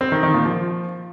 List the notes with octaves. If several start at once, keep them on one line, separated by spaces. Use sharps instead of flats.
C4
D#3
D#3
A#2
F3